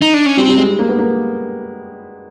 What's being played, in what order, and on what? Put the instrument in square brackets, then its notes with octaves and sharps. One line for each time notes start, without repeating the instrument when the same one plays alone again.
[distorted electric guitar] D#4
D4
C#4
[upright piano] G3 [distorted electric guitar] C4
[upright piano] G3
G#3
A#3
B3
A#3